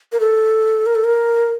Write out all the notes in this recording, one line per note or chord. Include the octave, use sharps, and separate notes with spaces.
A#4
A4
A#4
A4
A#4